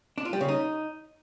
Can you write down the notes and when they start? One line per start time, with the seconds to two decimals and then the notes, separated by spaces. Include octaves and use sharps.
0.18 D4
0.25 F4
0.33 G3
0.41 C#3
0.48 D#4